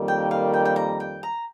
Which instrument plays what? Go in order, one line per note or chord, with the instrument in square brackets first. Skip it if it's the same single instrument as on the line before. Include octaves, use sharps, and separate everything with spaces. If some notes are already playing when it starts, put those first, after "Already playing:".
Already playing: [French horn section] F2 D#3 G3 A#3
[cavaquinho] G5
F5
G5
G5
A#5
G5
A#5